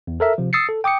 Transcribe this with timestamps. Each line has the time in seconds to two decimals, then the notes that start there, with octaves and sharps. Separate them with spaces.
0.07 E2
0.20 A4 A#4 E5
0.38 C3 F3
0.53 D#6 E6 A6 C7 C#7
0.69 A4
0.84 G5 D6 D#6 C#7